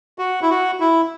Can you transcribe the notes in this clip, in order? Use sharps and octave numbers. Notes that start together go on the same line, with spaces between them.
F#4
E4
F#4
E4